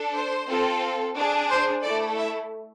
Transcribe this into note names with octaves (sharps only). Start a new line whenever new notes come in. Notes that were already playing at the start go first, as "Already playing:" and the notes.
Already playing: D4 A4
C5
C4 F4 A4
D4 G#4
C5
A3 E4 A4 D5
E5